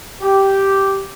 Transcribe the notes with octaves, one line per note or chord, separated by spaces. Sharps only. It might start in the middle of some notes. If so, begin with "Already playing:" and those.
G4